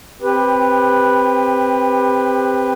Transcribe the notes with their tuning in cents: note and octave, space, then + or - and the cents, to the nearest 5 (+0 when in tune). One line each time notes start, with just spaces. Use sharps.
C4 +0 G4 +25 B4 +0